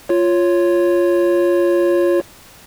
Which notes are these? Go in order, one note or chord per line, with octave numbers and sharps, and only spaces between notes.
F4 C#5